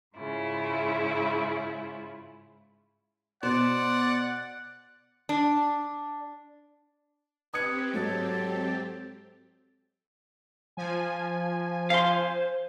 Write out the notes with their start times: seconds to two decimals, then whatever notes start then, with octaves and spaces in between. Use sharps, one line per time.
0.16 G#2 C#3 E4 F4
3.43 B2 C5 D5 F#5
5.29 D4
7.54 C4 G4 B4 D#6 G#6 C#7
7.94 G#2 F#3 A4
10.77 F3 G#5
11.90 C5 F5 C6